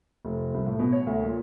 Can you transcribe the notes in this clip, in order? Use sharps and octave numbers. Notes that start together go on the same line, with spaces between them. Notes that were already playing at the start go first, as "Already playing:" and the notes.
F1
C2
A2
B2
C#5
D2
A#2